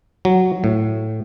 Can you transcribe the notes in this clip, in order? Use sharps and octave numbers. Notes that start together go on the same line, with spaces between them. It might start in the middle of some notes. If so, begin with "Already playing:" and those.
F#3
A2